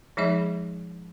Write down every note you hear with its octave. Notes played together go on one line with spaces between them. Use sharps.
F3 G#3 D#4 G#4 D#5 E5